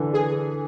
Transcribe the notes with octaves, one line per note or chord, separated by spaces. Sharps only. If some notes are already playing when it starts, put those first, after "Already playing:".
Already playing: D3 E3 D4
G#4